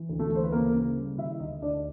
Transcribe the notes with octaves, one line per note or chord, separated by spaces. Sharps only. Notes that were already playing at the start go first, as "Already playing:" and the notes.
Already playing: E3
D2
A3 A4
E3 C5
B4
C#3 A#3 A#4
C#3
G3
D#3 E4 E5
D2 D#4 D#5
D2 D4 D5